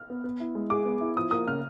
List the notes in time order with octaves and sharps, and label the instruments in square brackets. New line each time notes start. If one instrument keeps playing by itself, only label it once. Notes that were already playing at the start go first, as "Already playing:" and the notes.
Already playing: [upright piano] F6
[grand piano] B3
B3
E4
G#3
[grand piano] G#4 [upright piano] D6
[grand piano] B3
E4
[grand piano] F3 [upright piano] D#6
[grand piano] A#3 [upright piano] D#6
[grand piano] C#3 [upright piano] F6